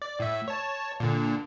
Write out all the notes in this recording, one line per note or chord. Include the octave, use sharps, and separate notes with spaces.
D5
A2 E5
C#5 A5
A#2 D3